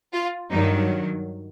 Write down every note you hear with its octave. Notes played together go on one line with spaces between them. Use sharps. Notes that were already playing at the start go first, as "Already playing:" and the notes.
F4
G2 D#3 F#3 D#4